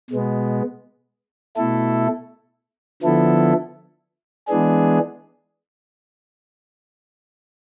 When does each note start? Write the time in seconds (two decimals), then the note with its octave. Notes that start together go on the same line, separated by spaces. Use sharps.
0.11 B2 G#3 B3
1.57 B2 A3 E4 A4
3.02 D3 F3 B3 E4 A4
4.48 E3 G#3 B3 D4 G#4